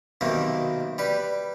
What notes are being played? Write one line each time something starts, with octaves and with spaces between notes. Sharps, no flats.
B1 C3 D#3 A#3
G3 B4